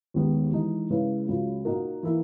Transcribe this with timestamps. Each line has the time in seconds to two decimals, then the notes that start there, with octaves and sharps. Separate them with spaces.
0.14 D#2 D#3 G#3 B3
0.52 E3 G#3 D#4
0.90 C#3 G#3 C#4 E4 B4
1.28 C#2 C#3 F#3
1.65 A#2 A#3 D#4 F#4 A#4
2.03 E3 A#3 E4 A#4